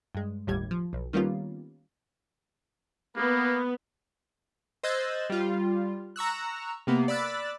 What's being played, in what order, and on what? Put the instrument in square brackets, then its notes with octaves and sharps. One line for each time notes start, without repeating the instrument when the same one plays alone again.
[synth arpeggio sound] G2 G#3
G1 D#2 A2 G3 G#6
F3
B1
D#3 G3 A#3 B3 C#4 F4
[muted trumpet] A#3 [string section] B3
[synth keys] C5 D#5 E6 F#6 G#6 A6
G3 F4
A#5 C#6 E6 F#6
C3 A#3 B3
D5 B5 E6 F#6 A6